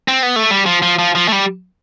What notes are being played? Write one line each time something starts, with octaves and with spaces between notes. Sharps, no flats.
C4
B3
A3
G3
F3
F3
F3
F3
A3
G3